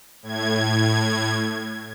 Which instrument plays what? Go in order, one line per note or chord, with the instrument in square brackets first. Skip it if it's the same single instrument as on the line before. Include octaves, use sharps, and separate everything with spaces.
[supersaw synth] A2 G#6